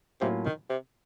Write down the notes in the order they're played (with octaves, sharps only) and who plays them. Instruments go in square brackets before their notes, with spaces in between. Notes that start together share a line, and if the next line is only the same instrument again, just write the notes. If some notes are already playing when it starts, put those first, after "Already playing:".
[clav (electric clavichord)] A2 F#3 A#3 C#4 F4 [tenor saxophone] C3
[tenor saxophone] D#3
C3